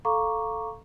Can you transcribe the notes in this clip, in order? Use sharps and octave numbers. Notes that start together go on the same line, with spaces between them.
A4 F5 A#5 C#6 D6